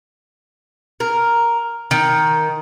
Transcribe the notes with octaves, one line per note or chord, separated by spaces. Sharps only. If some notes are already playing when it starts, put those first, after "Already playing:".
A#4
D#3